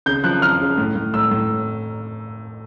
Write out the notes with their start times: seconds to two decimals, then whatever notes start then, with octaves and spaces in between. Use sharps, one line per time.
0.06 C#3 G6
0.24 F3 F#6
0.42 F3 F6
0.60 C#3
0.78 A2
0.96 A2
1.14 A2 E6
1.31 A2